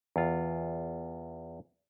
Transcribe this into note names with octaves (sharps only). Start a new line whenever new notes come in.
E2 F4